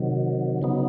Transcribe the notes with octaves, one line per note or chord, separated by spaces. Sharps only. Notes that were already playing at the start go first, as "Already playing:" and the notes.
Already playing: C3 D#3 F#3
C#3 F#3 B3 D#4